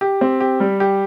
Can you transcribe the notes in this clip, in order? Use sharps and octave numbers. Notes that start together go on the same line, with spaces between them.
G4
C4
G4
G3
G4